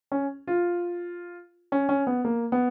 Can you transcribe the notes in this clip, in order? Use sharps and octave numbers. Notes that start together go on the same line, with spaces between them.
C#4
F4
C#4
C#4
B3
A#3
B3